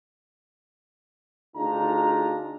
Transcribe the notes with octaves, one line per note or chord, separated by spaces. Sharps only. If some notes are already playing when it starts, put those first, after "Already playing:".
D2 D4 D#4 F4 G#4 A#5